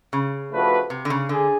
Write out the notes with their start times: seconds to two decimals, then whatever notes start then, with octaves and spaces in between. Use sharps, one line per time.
0.13 C#3
0.52 F3 A3 D4 F#4 B4
0.90 C3
1.05 D3
1.10 C#3
1.29 D3 G#4